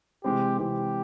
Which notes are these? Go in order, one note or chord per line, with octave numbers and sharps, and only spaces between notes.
C3 E3 G#3 C4 G4
C3 E3 G#3 C4 G4